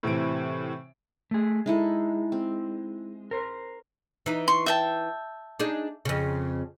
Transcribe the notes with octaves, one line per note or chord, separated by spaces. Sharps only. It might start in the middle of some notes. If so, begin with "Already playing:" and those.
A2 C3 E3 D7
A3 G#4
G#3 D#4 E4 A4
C4
A#4 C5
E3 D#4
C6 C#6
E5 G5 A5
D4 D#4 G#4
F2 C#3